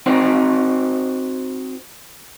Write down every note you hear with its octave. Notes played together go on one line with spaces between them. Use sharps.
C4 D#4 F#4 C5